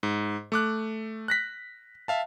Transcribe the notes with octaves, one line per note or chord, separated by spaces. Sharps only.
G#2
A3 D6 F#6
F#6 A#6 B6
E5 F5 A5